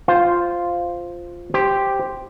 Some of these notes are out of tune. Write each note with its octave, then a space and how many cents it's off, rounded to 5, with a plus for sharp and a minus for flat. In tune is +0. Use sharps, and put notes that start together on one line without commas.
F4 +0 C5 +0 F5 -5
G4 +0 C5 +0